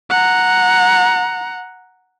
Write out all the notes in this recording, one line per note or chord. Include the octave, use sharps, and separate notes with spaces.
F#5 A#5